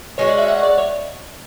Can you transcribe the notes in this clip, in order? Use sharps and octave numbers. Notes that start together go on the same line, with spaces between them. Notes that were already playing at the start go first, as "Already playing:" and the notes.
G#3 C#4 F#4 C#5
D5
E5
F#5
D5
C#5